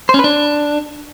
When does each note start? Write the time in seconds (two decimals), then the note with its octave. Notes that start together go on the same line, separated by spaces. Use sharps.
0.09 C5
0.14 C#4
0.19 B4
0.24 D4